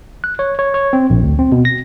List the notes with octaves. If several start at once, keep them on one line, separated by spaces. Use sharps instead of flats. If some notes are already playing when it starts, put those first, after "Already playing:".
F#6
C#5
C#5
C#5
C4
A#1
D2
C4
B2
A#6